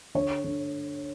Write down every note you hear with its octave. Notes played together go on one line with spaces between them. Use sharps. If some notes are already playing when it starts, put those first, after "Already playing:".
D3 C#5
D3